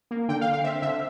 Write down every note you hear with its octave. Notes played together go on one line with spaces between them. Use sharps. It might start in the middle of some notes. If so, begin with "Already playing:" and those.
A#3
D3 G5
F5
D3
F5
C4 E5
D3 E5